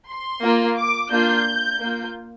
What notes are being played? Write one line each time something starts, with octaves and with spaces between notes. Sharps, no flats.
C6
A#3 F4
D6
A#3 D4 F4 G6
A#3 F4